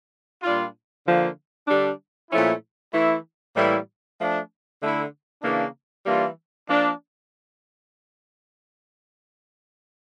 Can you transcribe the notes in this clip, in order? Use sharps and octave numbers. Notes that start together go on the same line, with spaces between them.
A#2 G3 D4 F4
D3 F3 A#3
D3 G3 D4
A#2 F3 A3 C#4 E4
E3 A3 E4
A2 E3 G3 A#3 E4
F3 A3 D4
D3 A3 E4
C#3 E3 A#3 D4
E3 G3 A#3 D4 F4
F3 A#3 D4